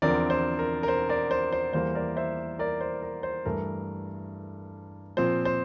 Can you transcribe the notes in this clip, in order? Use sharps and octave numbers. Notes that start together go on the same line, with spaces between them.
E2 D3 F3 C4 A#4 D5
C5
A#4
A#4
C5
A#4 D5
C5
C5
E2 E3 G3 A#3 C5
A#4 D5
C5 E5
A#4 D5
C5
A#4
C5
G2 E3 A3 A#4
A#2 F3 C4 C5
C5